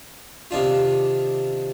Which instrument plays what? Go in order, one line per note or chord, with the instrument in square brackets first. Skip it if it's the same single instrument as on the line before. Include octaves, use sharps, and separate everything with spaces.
[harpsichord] C3 D#3 D4 F4